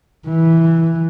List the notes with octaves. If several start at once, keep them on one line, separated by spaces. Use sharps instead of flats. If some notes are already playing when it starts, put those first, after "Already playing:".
E3